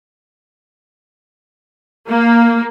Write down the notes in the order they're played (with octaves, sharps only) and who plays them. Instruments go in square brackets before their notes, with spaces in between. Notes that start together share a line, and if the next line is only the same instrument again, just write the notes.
[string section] A#3